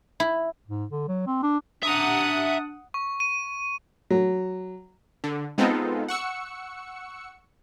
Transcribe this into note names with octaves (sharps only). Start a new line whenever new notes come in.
E4
G#2
D3
F#3
C4
D4
D4 E5 F#5 A#5 D#6
C#6
D#7
F#3
D3
G#3 B3 C4 D#4 F4 A4
F#5 C#6 E6 C#7